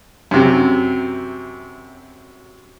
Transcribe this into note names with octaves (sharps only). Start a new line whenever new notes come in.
F#2 C3